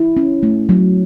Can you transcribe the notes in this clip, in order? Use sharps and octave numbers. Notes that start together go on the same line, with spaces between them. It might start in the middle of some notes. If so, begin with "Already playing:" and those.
Already playing: E4
C#4
A3
F#3